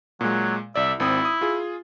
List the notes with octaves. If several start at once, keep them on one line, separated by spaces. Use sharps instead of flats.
A#2 F#3 G#3
C2 D5 E5
G#1 C4 E4 D#6
D#6
F4 G#4